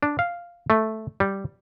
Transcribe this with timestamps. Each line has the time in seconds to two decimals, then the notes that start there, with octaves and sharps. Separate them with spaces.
0.03 D4
0.19 F5
0.70 A3
1.20 G3